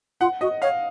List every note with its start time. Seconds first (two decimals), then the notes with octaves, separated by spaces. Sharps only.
0.21 F4 F#5
0.41 F#4 D#5
0.62 C#5 F5